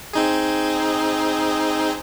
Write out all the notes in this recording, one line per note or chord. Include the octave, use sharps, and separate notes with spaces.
C4 D#4 G#4